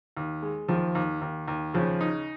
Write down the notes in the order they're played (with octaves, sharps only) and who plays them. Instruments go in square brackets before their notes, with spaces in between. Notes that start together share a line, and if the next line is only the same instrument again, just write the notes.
[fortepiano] D#2
G#3
[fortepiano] D#2 [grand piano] F3
[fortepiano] D#2
D#2
D#2
[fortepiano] C#3 [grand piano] F3
[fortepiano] D#4